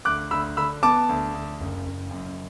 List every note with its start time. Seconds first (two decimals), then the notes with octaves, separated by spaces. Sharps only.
0.05 D2 D6 F#6
0.31 D2 B5 E6
0.57 D3 B5 E6
0.83 B3 A5 D6
1.09 D2
1.34 D2
1.61 F#1
1.86 F#1
2.11 F#2